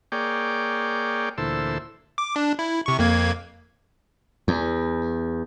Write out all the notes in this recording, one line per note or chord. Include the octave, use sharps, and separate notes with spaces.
A#3 G#4 C#5 D5 G5
D2 A#2 E3 A4 C5 E6
D6
D4
E4
C3 C#6
F2 A#3 G#6
E2